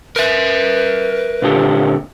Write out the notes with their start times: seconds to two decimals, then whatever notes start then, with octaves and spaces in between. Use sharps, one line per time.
0.16 A#4 B4 E5
1.42 A#2 D3 G4